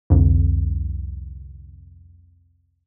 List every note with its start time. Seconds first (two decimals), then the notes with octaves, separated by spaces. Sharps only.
0.10 C2 F2 D3